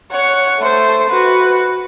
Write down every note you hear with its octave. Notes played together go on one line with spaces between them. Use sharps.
C#5 F#5
A3 C5
F#4 B4